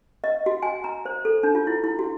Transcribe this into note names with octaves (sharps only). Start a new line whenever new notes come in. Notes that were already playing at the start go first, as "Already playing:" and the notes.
D#5
F#4
G#5
A#5
C5
A4
D4
F4
E4
E4
F#4